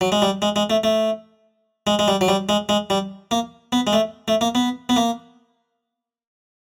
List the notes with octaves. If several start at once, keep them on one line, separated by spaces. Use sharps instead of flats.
F#3
G#3
G3
G#3
G#3
A3
A3
G#3
G#3
G3
F#3
G3
G#3
G#3
G3
A#3
B3
G#3
A3
A3
A#3
B3
B3
A#3